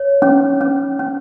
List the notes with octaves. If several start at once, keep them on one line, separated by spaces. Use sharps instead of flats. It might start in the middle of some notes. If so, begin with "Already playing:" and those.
Already playing: C#5
C#4
C#4
C#4